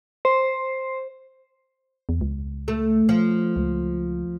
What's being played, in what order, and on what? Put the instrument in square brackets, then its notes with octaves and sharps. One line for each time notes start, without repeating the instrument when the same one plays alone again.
[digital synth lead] C5
[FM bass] E2
C#2
[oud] A3
F3
[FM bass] C#2